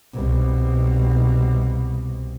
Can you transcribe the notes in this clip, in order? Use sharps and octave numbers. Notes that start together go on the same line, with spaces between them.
C2 B2